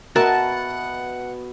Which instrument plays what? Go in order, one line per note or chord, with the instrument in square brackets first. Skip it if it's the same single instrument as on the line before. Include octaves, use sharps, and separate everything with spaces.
[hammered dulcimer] B2 B3 B4 [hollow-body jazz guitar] F#4 A#4 E5 [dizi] F#5 [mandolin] A5